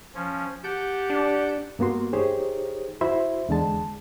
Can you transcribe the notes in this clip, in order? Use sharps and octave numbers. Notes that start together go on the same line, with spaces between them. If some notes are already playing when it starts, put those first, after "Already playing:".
F3 C#4
G4 F#5 A5 G6
D4
G2 A#3 B3 F#4 C6
D#4 G4 G#4 C5 C#5
E4 F#4 C5 E5 B5 C6
E2 D3 G#3 A5